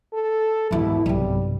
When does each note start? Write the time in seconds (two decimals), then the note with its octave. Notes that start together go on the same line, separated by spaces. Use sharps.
0.14 A4
0.71 D#2 G#2 B2 E4
1.06 B1 G2 C3 G3